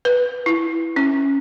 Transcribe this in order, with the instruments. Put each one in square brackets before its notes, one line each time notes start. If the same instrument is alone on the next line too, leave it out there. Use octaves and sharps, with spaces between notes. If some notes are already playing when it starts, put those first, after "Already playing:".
[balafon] B4
E4
C#4